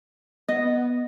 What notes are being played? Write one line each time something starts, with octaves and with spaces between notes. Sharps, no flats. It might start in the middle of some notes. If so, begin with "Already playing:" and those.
B3 D#5